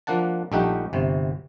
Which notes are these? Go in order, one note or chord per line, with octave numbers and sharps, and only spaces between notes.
F3 A#3 D4 F#5 A5
A#1 G3 A3 D#4 G4 F#5
G1 C3